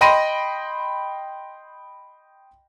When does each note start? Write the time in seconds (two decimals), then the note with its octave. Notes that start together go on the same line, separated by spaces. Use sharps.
0.01 D#5 G5 B5 C6 A#6 D#7